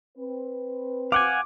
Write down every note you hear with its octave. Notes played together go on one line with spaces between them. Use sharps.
C4 B4
F5 F#5 G#5 D6